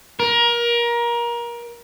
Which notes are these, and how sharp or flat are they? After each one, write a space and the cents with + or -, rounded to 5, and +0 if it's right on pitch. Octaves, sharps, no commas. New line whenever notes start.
A#4 +25